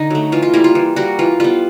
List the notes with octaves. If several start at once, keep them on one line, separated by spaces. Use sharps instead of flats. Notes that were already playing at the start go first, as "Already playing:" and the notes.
Already playing: D3 D#4
F#3 A3
E3 F4
F4
G3 A#3 E4
F4
E3
G3 A#3 F#4
E3 F4
G3 B3 F4